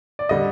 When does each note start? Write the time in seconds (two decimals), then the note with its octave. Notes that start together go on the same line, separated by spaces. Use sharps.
0.19 D5
0.29 D3 G3 D#5